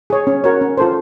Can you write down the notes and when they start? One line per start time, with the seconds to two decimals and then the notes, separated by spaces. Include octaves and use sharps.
0.10 G#4 C#5
0.27 C#4
0.44 F#4 A#4 C#5
0.61 C#4
0.78 F4 A4 C5